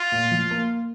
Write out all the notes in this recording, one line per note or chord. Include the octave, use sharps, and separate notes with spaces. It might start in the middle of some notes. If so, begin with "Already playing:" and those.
Already playing: F4
A#2
F3
A#3